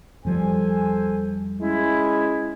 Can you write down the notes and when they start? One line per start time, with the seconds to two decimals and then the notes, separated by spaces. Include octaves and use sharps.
0.25 F2 F3 G3 A4 C5 G#5
1.61 G#3 C#4 E4